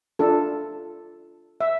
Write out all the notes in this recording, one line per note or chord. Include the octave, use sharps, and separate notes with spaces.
D4 F4 A4
E5